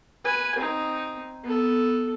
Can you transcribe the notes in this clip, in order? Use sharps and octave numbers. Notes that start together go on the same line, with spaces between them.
B4 G#5
C4 D#4
B3 A4